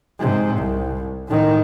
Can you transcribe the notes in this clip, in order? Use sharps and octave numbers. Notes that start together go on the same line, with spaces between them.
G#2 C3
C2
A2 D#3